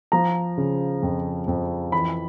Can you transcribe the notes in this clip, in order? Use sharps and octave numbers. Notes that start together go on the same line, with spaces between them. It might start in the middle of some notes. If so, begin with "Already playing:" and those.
F3 A#5
C#3
F2
F2
E3 B5